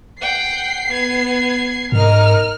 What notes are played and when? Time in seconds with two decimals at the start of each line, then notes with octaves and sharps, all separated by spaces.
0.21 F#5 G5 C7
0.88 B3 G#6
1.92 G#2 D#4 A#4 F6